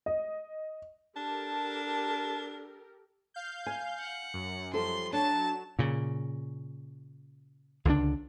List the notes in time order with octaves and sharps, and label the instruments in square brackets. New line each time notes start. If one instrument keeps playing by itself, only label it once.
[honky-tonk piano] D#5
[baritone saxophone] D4 [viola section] G4 A4 A#4 [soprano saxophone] A5
[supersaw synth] F5 G6
[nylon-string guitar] G#5
[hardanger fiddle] F#5
[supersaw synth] F#2
[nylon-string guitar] F3 G3 A4 [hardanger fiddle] C6
[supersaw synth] F#3 E7 [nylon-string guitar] D4 [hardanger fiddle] A5
[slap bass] A#2 C#3
C#2 D3 E3 D4